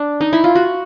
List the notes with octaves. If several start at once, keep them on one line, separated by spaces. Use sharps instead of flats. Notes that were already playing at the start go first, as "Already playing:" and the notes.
Already playing: D4
D#4
E4
F4
F#4